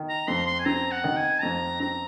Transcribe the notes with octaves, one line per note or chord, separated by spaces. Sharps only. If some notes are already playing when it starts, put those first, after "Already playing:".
Already playing: D#3
A#5
F2 C6
C6
G#5
C4 A#5
F#5
D#3
G#5
F2 A#5
C4 A#5